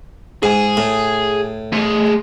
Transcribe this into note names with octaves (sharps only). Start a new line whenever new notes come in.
G#2 G#4 G#5
A2
A3 G#4